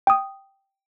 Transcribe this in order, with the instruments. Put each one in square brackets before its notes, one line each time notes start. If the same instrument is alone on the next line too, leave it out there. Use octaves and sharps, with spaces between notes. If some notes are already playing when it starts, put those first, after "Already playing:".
[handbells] G5 D#6